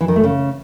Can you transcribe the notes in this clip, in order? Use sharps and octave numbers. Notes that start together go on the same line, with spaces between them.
E3
D#3
A3
C#3